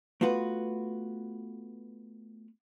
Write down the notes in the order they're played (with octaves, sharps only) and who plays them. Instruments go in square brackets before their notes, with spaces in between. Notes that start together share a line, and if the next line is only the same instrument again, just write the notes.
[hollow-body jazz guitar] A3 B3 F4 F#4 B4